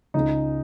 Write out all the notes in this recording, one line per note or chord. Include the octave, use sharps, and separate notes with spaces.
C#2 C#3 G#3 D#4